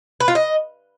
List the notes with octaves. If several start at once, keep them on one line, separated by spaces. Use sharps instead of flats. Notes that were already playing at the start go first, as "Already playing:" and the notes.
B4
F4
D#5